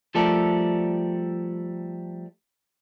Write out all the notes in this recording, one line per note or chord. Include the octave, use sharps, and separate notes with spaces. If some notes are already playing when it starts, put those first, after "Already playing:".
F3 G3 A3 A4 A#4 D5